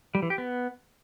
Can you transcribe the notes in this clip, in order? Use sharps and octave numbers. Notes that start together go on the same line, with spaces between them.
G3
E3
G4
B3